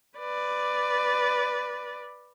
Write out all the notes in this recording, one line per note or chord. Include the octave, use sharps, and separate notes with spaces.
B4 D5